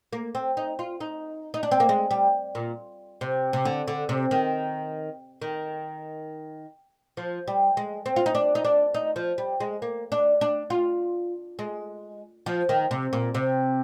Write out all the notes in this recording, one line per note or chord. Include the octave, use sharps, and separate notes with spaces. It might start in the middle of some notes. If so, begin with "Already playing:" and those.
A#3
C4
D#4
F4
D#4
D#4
D4
C4
A#3
G#3
G3
A#2
C3
C3
D3
D3
C3
D#3
D#3
F3
G3
G#3
C4
F4
D#4
D4
D#4
D4
D#4
F3
G3
G#3
A#3
D4
D4
F4
G#3
F3
D#3
C3
A#2
C3